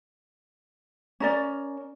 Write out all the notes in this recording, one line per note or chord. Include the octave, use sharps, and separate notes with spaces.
C#4 A#4 D5